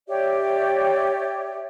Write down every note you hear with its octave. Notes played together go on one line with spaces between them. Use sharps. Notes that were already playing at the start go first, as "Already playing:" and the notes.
G4 C#5 D5 E5